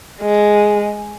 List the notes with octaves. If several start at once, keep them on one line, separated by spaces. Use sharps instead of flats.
G#3